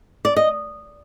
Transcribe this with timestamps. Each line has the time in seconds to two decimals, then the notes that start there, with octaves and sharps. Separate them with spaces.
0.25 D5
0.36 D#5